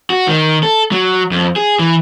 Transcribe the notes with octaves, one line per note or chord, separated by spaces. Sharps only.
F#4
D#3
A4
F#3
F2
G#4
E3